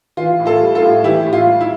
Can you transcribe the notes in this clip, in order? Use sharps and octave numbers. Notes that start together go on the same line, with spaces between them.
E3 F4
A2
F4 A4
G3
F4 A4
A2
E3 E4 G4
A2
F4
G3
E4